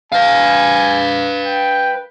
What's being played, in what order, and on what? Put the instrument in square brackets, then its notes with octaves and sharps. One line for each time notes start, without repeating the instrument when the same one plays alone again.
[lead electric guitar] B4 F5 [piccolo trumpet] G#5
[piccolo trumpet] G5